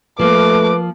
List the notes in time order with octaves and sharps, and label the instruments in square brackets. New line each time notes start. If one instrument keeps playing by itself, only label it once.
[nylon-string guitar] F3 A#3 [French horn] A3 [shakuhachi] B4 [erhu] D6